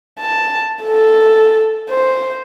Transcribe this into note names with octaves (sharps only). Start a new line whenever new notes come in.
A5
A4
C5